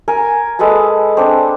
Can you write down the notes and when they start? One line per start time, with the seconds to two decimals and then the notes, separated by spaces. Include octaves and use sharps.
0.08 A#4 G#5
0.59 G#3 A4 B4 A5
1.17 C4 D4